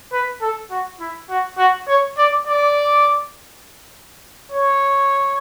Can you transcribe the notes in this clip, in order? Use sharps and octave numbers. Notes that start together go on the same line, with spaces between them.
B4
A4
F#4
E4
F#4
F#4
C#5
D5
D5
C#5